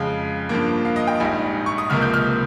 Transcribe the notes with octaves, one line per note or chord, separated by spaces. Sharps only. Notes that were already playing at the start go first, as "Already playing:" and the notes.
Already playing: F2 C#3 G#3 F5
G2 F3 A#3
F5
D#5
G5
A#1 G#2 G3 G#5
C#6
D#6
C#2 C3 F3 A#3 F6
G6
F6